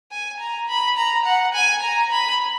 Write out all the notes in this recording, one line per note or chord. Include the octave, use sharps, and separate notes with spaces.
G#5
A#5
B5
A#5
F#5
G#5
A#5
B5